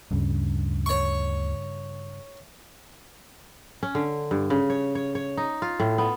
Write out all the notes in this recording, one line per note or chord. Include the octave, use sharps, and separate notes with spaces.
D2 G2 C#3
C#5 C#6
C#4
D3
G2
C#3
C#5
C#5
C#5
D#4
F4
A2
B3